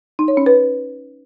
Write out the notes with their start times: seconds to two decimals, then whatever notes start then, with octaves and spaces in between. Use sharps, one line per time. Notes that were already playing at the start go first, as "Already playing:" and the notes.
0.19 D#4
0.28 C#5
0.37 C#4
0.46 B4